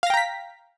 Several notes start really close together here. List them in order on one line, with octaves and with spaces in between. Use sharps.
F5 A#6 G5 A#5 B6